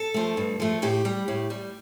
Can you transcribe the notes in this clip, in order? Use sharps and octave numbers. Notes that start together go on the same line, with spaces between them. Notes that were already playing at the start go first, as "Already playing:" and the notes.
Already playing: A4
F3 A3
G2
F3 A3
A2 G4
G3
A2
G3